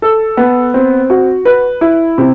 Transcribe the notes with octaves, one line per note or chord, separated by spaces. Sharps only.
A4
B3
C4
F#4
B4
E4
C3